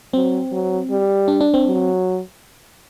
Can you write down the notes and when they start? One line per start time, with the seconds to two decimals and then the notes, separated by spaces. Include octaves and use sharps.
0.13 F#3 C4
0.52 F#3
0.90 G3
1.28 D4
1.41 D4
1.54 C4
1.66 F#3